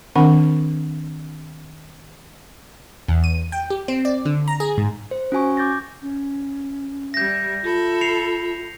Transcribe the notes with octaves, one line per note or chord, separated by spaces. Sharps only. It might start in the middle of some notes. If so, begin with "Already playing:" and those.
D#3 C4 D4 A#4 F#5 B5
E2
D#7
G5
G4
C4
D5
D3
A#5
G#4
G#2
C5
C#4 F#4 G#5 C#6
D6 G6 A6 A#6
C#4
G3 E5 G6 A#6
F4 A4 E5 B5
C7 C#7 F7